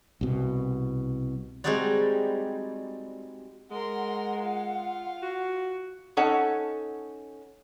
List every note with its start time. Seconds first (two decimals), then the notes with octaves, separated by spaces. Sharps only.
0.21 C2 B2
1.64 G3 G#3 C4 D#4 F#4 D5
3.71 G#3 A#4 F#5 C6
4.40 F4 F5
5.22 F#4
6.17 C#4 D#4 A4 C#5 F#5